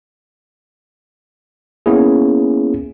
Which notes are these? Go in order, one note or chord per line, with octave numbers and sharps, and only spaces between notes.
A#3 B3 C#4 E4 G#4